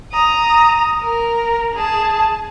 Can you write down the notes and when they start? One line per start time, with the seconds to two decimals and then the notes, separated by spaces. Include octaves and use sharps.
0.12 A#5 D#6
1.00 A#4
1.74 G#4 A5